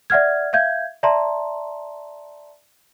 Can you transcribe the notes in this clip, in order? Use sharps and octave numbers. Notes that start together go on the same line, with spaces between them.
D5 E5 F#5 F6 G#6
E5 F5 G6 G#6
D5 E5 A5 A#5 C6